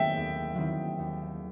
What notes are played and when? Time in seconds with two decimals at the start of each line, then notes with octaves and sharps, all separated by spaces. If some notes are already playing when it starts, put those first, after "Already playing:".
Already playing: D#3 F#3 C4 E5 G5
0.16 D#2
0.55 D#3 F#3 C4 E4
0.99 D#2